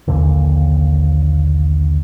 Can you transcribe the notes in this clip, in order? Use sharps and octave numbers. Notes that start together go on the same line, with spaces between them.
A#1 D#2 A#2 D3